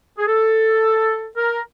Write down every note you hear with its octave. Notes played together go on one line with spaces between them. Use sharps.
G#4
A4
A#4